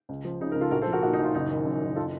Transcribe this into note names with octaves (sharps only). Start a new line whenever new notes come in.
C#2
F3
C#3 D#4
C#2 A#4
F4 A4
A#1 F#4 A#4
A4 C5
F3
F#4 A#4
A#2 D#4 F#4
D#4
A#1 F4
F#1 D#4 F#4
D#3
F#2
F#1
F4 A4